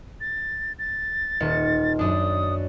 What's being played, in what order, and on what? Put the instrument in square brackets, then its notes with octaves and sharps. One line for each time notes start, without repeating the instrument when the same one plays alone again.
[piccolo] A6
A6
[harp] D#1 D#3 C#7
[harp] F#2 D4 [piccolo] D#6